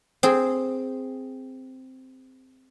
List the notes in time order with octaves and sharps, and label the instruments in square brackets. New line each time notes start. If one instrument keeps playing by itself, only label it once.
[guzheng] C4 G#4